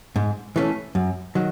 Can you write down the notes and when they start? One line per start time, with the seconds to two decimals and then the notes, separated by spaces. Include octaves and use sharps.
0.16 G#2
0.56 E3 A3 C#4
0.95 F#2
1.35 D#3 F#3